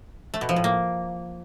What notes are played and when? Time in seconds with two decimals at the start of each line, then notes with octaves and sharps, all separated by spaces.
0.34 A3
0.41 B2
0.49 F3
0.56 A2
0.64 A#3